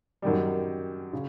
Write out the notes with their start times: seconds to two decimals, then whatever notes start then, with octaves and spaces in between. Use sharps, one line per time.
0.22 F#2 D#3 G3
1.13 C#3